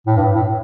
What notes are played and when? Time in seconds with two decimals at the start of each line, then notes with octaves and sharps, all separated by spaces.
0.07 A2
0.16 G2
0.35 A2